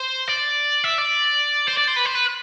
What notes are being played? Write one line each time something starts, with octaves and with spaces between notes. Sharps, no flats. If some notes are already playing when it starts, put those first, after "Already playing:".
Already playing: C5
D5
E5
D5
C5
D5
C5
B4
C5
B4